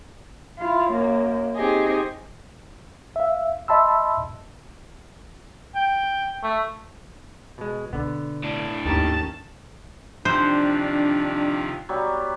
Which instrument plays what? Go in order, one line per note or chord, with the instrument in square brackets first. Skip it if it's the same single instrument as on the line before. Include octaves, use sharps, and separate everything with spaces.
[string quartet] E4 F4
F#2 A#3
C4 D#4 G4 G#4 D#5
[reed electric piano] E5 F5
D#5 E5 A5 B5 C6 E6
[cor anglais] G5
A3
[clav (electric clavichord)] B2 G#3
[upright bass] B2 [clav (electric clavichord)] D3 B3
[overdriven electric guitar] A2 D4
[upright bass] D#2 G#2 [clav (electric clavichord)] D#3 G4 A#4 [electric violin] C#4 A5
[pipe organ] C3 D#3 F3 [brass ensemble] D4 [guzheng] C5 [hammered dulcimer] F#5
[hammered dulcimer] F#3 G3 B3